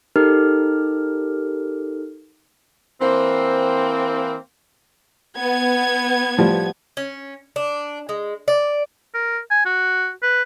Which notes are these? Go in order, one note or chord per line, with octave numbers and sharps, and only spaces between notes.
D#4 G4 A4 A#4 F6
E3 A#3 C4
B3 G#6
A2 F3 G3
C#4
D4
G#3
D5
A#4
G#5
F#4
B4